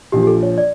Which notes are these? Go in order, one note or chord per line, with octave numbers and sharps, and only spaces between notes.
A#1 A#2 F3 G4
G4
A4
C#5
D5